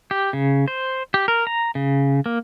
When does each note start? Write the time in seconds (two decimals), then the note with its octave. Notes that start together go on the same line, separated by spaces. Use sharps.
0.11 G4
0.33 C#3
0.68 C5
1.14 G4
1.28 A#4
1.47 A#5
1.75 C#3
2.26 A#3